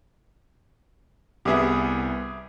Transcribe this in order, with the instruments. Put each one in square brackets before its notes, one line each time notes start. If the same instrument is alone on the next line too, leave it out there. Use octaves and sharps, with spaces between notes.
[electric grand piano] C2 B3 [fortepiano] G4 G#4 E5